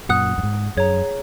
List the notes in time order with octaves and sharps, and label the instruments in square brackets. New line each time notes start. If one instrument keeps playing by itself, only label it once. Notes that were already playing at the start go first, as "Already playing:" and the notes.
[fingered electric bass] F#2 A#2 [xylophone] F#5 D#6 F#6
[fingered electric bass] F#2
G#2
[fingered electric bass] F#2 [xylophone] G#4 C#5 A#5